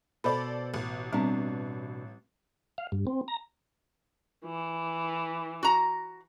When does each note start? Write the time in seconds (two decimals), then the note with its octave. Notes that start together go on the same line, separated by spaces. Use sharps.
0.24 B2 A4 C5 D5 B5
0.74 A1
1.13 B2 G3 C4 D4
2.78 F5
2.92 G2
3.07 C4
3.28 A#5
4.45 E3
5.63 F#4 A#5